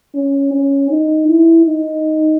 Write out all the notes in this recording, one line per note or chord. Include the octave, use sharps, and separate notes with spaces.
C#4
C#4
D#4
E4
D#4